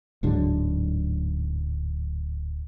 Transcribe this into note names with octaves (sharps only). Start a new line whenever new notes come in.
D1 G#2 D3 F#3